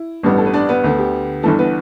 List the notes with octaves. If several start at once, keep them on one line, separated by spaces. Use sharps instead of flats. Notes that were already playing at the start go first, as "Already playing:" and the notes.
Already playing: E4
A1 G2 G3 B3
A4
B4
D4 D5
B3 B4
D2 D3 B3
G4
G1 G2 E3 A4
B3 B4